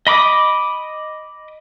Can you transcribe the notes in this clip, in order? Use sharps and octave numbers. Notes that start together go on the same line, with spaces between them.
D#5 B5 D6 D#6